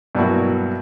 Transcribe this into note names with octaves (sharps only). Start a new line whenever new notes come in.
G2 B2 F#3 A#3 E4 F#4